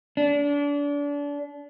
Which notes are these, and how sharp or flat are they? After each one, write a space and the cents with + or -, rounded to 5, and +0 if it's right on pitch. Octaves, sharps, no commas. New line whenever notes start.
D4 -30